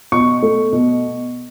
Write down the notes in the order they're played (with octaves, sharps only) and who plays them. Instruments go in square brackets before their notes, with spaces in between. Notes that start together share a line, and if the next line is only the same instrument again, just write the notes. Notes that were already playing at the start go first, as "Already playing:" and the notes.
[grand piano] B2 C#6
A3
B2